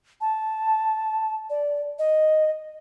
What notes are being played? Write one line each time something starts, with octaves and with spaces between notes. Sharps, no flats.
A5
D5
D#5